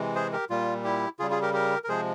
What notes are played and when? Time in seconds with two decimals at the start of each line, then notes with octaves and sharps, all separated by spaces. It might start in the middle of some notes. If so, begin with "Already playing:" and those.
Already playing: C3 E3 G#3
0.15 G#4 C5
0.33 G4 A#4
0.50 A#2 G3 F4
0.84 E4 G4
1.19 C#3 G3 F4 G#4
1.30 F4 G#4
1.42 G4 A#4
1.53 G4 A#4
1.84 A#4
1.88 C3 F3 G#3 G#4 C5